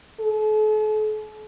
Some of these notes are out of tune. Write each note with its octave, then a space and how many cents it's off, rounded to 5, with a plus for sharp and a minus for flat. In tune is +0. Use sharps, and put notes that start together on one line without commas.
A4 -45